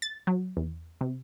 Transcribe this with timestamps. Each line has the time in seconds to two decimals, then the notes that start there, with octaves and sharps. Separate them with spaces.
0.02 A6
0.27 F#3
0.57 E2
1.01 C3